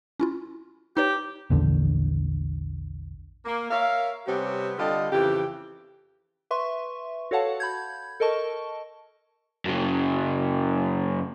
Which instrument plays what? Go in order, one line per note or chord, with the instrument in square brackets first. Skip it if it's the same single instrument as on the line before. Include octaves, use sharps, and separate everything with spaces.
[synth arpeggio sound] C#4 E4 F4
[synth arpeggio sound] D#4 B4 C#5 [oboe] G4
[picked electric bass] A#1 E2 D3
[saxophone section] A#3
A#4 C#5 E5 F5
C3 G3 B3 C#4 G4
D3 G3 F4 G4 A4 D#5
F2 C#3 E3 G4
[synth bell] B4 E5 C6 C#6
F#4 A4 C#5 F5 F#5 A5
B5 G6 G#6
A4 A#4 D#5 A5 C#6
[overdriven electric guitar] F#2 C#3